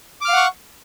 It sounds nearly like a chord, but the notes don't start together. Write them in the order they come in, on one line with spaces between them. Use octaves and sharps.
D6 F6 F5 F#5 C#6